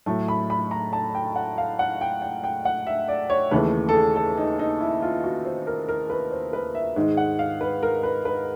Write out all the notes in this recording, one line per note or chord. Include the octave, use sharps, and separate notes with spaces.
A2 F#3 A3
B5
B5
A#5
A5
G5
F#5
F5
F#5
G5
G5
G5
F#5
E5
D5
C#5
D#2 C#3 E3 A3 B4
A4
G#4
A4
D#4
D#4
E4
F4
F#4
C5
A#4
A#4
B4
C5
B4
E5
G#2 D#3 G#3
F#5
F5
B4
A#4
B4
B4